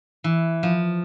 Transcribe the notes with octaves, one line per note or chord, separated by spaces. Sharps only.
E3
F3